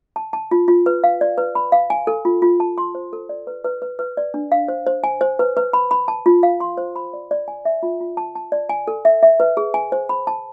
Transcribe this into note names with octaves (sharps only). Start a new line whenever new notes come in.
A5
A5
F4
F4
B4
F5
D5
B4
B5
F5
G#5
A4
F4
F4
A5
C6
C5
A4
D5
B4
B4
B4
B4
D5
D4
F5
C5
C5
G#5
C5
B4
B4
B5
B5
A5
F4
F5
C6
C5
B5
D5
D5
G#5
E5
F4
F4
A5
A5
D5
G#5
A4
E5
E5
B4
G#4
G#5
C5
B5
A5